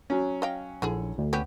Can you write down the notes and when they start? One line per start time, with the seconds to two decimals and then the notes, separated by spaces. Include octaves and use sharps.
0.10 F#3 C#4
0.42 D#5 F5 G5
0.82 A#1 D3 E4 G#4
1.18 D2
1.33 B3 C#4 G4